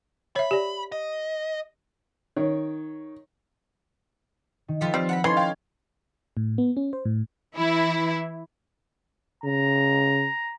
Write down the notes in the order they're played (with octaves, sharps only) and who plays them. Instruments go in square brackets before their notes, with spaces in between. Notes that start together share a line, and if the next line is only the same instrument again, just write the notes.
[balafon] C#5 E5 [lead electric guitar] B5
[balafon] G4 D5
[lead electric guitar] D#5
[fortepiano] D#3 C#5
[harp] D#3
[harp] F3 B4 [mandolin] F4 G4 A4
[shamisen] G3 [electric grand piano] C4 [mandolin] F4
[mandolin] F#5 A5 B5
[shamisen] E3 [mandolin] C4 F4 C6 [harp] C#4 D#4 A4 [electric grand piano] G#6
[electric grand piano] F5 G5
[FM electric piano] A2
B3
C#4
C5
A2
[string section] E3 E4
[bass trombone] C#3 [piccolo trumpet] A#5